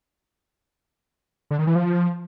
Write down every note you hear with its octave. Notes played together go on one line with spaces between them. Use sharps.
D3
D#3
E3
F3